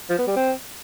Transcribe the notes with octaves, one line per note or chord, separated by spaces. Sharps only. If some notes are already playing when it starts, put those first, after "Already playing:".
F3
B3
G3
C4